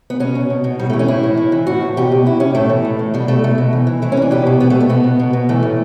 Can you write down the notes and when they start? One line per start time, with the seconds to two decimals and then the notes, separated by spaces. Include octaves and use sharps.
0.10 B3
0.20 B2 C#4
0.35 B2
0.50 B2
0.64 B2
0.79 A2 G3
0.90 A3
0.93 E3
0.99 C#4
1.08 A2 E4
1.23 A2
1.37 A2
1.52 E3
1.67 A2 F#4
1.82 A2
1.97 B2 G4
2.12 B2
2.25 B2 E4
2.40 B2 C#4
2.55 A2 A3
2.70 E3
2.85 A2
2.99 A2
3.14 B2 G3
3.28 B2 A3
3.44 B2 A3
3.58 B2
3.73 E3
3.87 E3
4.02 E3 A3
4.12 C#4
4.17 E3 D4
4.31 B2 G4
4.46 B2
4.60 B2 B3
4.70 A3
4.75 B2
4.81 A3
4.89 B2 B3
5.04 B2
5.20 B2
5.33 B2
5.49 E3 A3
5.63 A2